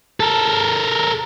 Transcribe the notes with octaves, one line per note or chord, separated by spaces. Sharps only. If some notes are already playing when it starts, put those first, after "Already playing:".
A4 A#4